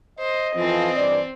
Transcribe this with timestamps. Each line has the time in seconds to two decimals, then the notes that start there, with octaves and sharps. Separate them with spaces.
0.19 C5 D#5
0.56 F2 E3 F3 C4
0.96 G2 E3 D5